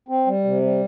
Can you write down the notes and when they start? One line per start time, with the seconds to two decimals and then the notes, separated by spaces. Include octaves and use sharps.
0.08 C4
0.26 G3
0.44 C3
0.62 G3